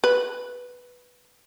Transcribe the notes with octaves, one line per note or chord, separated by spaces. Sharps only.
B4